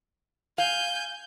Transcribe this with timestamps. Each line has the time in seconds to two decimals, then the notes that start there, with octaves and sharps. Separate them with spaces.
0.58 F5 G#5 G6